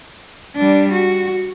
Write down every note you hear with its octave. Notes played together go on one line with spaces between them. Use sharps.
G3 D4
F#4